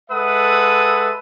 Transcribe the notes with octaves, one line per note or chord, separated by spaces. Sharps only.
G#3 A4 B4 E5 F#5 D#6